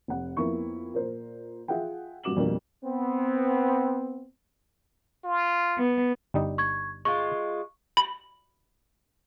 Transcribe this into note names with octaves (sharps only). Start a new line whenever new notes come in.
F1 F#5
F2 A#3 B3 E4 C#6
A#2 A#4 C5
F4 G#4 E5 F#5 G5
G2 A#2 F#4 D6 E7 F#7
F2 B2 G3 A#3 D4
B3 C4
F4
B3
G1 G3 D#4
C#6 G#6
G#3 F4 C#6
B5